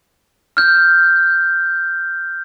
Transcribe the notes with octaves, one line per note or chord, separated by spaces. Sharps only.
F6 G6